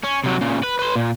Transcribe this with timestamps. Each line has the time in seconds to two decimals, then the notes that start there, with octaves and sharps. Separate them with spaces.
0.04 C#4
0.24 C3 F#3
0.41 A#2 C#3
0.64 B4
0.79 B4 C6
0.96 A#2